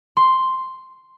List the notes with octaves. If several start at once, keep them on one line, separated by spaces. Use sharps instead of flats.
C6